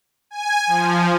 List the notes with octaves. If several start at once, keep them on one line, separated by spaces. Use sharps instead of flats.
G#5
F3